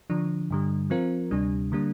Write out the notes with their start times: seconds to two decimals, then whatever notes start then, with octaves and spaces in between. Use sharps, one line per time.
0.10 D3 F3 D4
0.50 G2 D3 G3
0.90 F3 C4 F4 A#4
1.31 D2 C3 G3 D4
1.72 D3 G3 A#3 D4